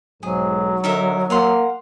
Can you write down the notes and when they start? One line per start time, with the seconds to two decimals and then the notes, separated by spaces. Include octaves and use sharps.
0.23 B1 G#2 F#3 G#4
0.84 D3 D#4 A#4 E5
1.30 A#3 F5 F#5 C6